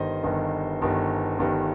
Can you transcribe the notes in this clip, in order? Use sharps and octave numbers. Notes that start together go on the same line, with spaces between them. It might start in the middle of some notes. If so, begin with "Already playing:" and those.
Already playing: G1 G2 D#3 C5 D#5
G1 G2 D#3
G1 G2 D#3
G1 G2 D#3